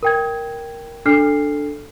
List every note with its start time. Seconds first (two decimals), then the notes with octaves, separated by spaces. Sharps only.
0.03 A#4 G5 G#6
1.06 D4 A4 F6 C7